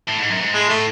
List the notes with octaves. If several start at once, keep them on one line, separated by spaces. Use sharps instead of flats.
A2
G#2
F#2
G#2
A2 G#3
A2 A3